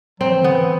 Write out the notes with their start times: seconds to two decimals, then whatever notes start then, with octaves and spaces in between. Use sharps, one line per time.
0.20 F#3 C4
0.30 E3
0.41 D3 B3
0.51 E3